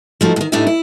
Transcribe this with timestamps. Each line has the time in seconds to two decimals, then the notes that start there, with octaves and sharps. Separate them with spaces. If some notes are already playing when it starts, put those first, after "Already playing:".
0.21 F3 A3 D#4 F#4
0.36 A2 D#3
0.52 A2 D4 D#4 G4 E5
0.67 E4